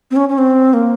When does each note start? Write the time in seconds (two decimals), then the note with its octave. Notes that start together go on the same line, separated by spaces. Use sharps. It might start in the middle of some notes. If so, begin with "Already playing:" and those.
0.11 C4
0.16 C#4
0.29 C#4
0.38 C4
0.74 A#3